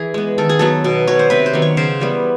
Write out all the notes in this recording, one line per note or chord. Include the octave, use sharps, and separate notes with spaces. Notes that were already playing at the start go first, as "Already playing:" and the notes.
Already playing: E3 G#4
G#3 B3
D#3 A4
G#4
F#3 B3 A4
B2
F#3 B3 C#5
C5
C3 B4
C5
D#3 F#3 B3
C#5
C#3 C5
E3 G3 B3